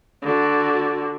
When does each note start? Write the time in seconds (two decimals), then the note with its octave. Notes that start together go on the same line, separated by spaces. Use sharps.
0.22 D3 F#4